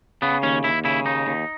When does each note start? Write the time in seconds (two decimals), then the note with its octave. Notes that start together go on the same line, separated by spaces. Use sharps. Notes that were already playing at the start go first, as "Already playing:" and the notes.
0.22 C#3 B3
0.43 D#2 C#4
0.64 D#2 E4
0.85 C#3 E4
1.05 D#2 D#4
1.27 D#2